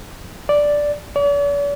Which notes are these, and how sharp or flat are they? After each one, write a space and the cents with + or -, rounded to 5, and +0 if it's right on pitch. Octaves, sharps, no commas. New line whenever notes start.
D5 +0
D5 -45